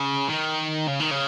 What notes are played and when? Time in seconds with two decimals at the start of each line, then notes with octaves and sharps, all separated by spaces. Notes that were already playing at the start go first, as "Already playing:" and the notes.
Already playing: C#3
0.30 D#3
0.88 C#3
1.00 D#3
1.11 C#3